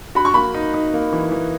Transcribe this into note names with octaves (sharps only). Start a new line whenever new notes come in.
F#4 B5
C#6
A#3 B5
D#4
D#4
A#3
E3
E3